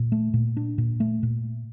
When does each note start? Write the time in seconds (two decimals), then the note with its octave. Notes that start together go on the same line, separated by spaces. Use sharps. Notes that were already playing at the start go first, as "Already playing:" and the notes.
Already playing: A#2
0.12 A3
0.34 A#2
0.57 D4
0.78 A#2
1.00 A3
1.23 A#2